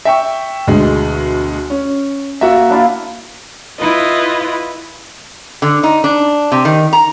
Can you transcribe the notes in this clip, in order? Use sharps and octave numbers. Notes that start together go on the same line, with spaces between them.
E5 G5 C#6
D2 B2 G#3
C#4
A#3 F#4 E5
D4 E4 F4
E4 F4 B4 D#5
D3
D#4
D4
C3
D#3
A#5